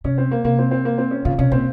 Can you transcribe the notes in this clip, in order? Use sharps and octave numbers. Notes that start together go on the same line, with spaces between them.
C3 C#4
C4
A#3
C3 A#3
C4
C4
A#3
C4
C#4
C#3 F4
C3 C#4
A#2 C4